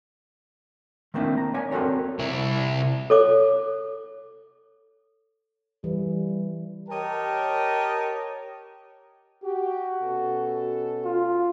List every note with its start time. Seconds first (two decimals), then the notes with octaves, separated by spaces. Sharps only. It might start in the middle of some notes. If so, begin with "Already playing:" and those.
1.14 D#3 A3 A#3 C4 D4 E4
1.38 A#5
1.54 C#5 D5 G#5
1.71 C4 F#4 A4 A#4 C#5
2.19 C2 E4
3.10 A4 C#5 D6
5.84 E3 G3
6.89 G4 A#4 C#5 D#5 G5 A5
9.44 F#4 G4
10.02 B2 C#4 A4
11.05 F4